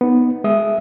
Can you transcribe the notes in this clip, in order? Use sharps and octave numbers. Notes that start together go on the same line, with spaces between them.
B3 D#4
G#3 E5 D#6